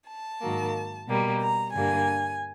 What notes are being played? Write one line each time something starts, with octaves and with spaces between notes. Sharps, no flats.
A5
G#2 D#3 F#3 A#3
B2 G3 A#3
A#5
G2 D3 G3 A#3 G#5